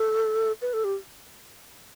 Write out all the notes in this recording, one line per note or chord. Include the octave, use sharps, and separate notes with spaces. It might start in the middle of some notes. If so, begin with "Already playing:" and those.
Already playing: A4
B4
A4
G4